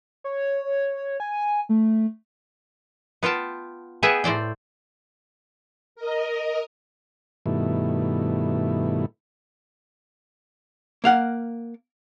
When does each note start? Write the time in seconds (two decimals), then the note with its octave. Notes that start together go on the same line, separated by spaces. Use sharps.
0.24 C#5
1.20 G#5
1.69 A3
3.23 B3 F4 G5 A5
4.03 B3 G#4 E5 F#5 G5
4.24 A2 C5 D5 G5
5.95 A#4 D#5
7.46 G2 B2 D#3 A3 E4
11.04 A#3 F5 F#5